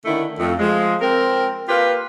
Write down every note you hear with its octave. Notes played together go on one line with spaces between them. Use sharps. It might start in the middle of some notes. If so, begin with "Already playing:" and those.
D3 D#3 A3 C#4 E4
F2 A3
F3 G#3
C4 A#4
A#3 F4 G4 A#4 B4